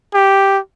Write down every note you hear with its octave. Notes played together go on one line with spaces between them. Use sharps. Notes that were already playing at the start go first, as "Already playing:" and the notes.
G4